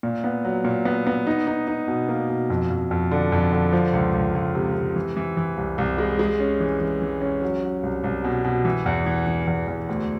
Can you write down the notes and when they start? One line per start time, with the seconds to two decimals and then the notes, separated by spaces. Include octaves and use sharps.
0.03 A#2
0.24 B3
0.45 F#3
0.65 A#2
0.85 B3
1.07 B3
1.27 D#4
1.47 D#4
1.68 D#4
1.88 B2
2.09 A#3
2.29 B2
2.50 F2
2.70 F2
2.91 F2
3.11 D3
3.32 F2
3.53 D3
3.73 F3
3.93 C#2
4.14 C#2
4.35 C#2
4.55 C3
4.75 C3
4.96 E3
5.17 E3
5.37 E3
5.57 C2
5.78 C2
5.98 G#3
6.19 G#3
6.40 C#4
6.60 E3
6.80 E3
7.02 E3
7.22 C#4
7.42 F#3
7.63 F#3
7.83 C2
8.04 C2
8.24 B2
8.44 B2
8.65 E3
8.86 E2
9.06 E3
9.27 E3
9.47 E2
9.68 E2
9.89 D2